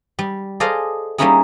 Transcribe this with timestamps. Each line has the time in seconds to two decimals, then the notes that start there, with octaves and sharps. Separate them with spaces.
0.19 G3
0.60 G#4 A4 C5 D5 D#5 F5
1.18 G3 A#3 C#4 D#4 E4 G#4